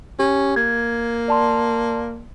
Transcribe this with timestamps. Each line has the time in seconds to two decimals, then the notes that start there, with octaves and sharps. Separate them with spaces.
0.19 C#4 G4
0.56 A#3 G#6
1.28 D5 A5 C6